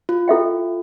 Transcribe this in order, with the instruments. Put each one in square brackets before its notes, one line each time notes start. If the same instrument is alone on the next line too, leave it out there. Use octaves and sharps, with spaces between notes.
[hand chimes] F4
[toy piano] E4 A4 E5 G5